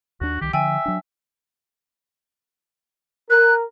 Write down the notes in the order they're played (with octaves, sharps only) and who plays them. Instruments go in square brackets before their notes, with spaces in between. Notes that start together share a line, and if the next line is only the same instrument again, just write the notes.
[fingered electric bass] D#2 D4 [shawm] F#4
[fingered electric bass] C2 D#3 [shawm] G4
[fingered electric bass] D3 F3 [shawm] E5 [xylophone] G5 G#5
[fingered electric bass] F#3 D4
[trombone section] A#4 [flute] F#6